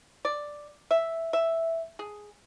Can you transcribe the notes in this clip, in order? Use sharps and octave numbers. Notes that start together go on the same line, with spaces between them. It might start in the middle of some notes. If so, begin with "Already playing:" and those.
D5
E5
E5
G#4